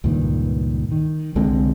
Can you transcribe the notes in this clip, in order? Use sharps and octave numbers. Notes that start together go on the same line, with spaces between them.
C#2 G2 A#2 D#3
D#3
C2 D3 G#3 C4